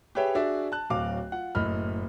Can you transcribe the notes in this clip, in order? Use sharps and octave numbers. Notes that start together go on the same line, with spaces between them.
G4 G#4 B4 C#5 E5 G5
D4 F#4 G#4 D5 E5
A5 F#6
D1 F#3 F5 D6
F4 F#5
F#1 A2 D#5 B5 F6